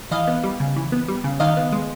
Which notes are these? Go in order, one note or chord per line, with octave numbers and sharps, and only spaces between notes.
E3 D#5 F5
B3
G3
C#3
E3
B3
G3
C#3
D#3 D#5 F5
B3
G#3